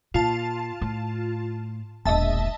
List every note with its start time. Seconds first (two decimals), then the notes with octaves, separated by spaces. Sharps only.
0.14 A#2 F4 A5
0.81 A2
2.05 E1 A#1 D#5 E5 A5